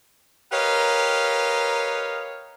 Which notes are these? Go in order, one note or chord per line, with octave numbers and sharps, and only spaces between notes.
G4 A#4 B4 C#5 D#5 F5